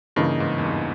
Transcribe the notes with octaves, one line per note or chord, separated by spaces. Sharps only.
G2 C#3 E3 A#3 D#4
G#2
E2
G2